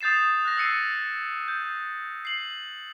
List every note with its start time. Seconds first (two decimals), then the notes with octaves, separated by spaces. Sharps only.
0.01 D#6 G6 A6 C7 E7
0.45 F#6 A#6
0.57 E6 C7 C#7 D#7
1.48 G6
2.25 C7 F#7